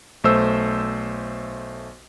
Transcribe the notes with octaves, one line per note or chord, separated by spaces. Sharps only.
B1 A3 C5 E6